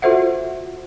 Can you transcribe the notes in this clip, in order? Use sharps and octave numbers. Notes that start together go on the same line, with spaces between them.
F4 F#4 A4 C5 E5 F#5